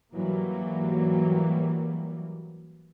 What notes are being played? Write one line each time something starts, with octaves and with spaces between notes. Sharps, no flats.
G#2 E3 F#3 G3 A#3